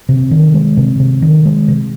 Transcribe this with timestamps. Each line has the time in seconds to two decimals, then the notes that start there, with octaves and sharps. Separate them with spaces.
0.09 C3
0.31 D#3
0.54 G#3
0.77 C3
1.00 C3
1.22 D#3
1.45 G#3
1.68 C3